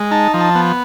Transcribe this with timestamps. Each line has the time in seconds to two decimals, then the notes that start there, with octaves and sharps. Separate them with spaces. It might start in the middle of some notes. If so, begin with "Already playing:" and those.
Already playing: G#3
0.11 D#4 A5
0.34 F3
0.41 A5
0.55 B3